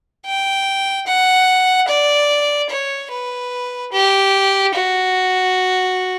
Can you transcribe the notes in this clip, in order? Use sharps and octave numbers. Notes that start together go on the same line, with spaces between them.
G5
F#5
D5
C#5
B4
G4
F#4